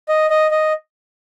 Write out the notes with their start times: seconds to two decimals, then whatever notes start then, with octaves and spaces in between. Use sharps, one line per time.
0.09 D#5
0.30 D#5
0.51 D#5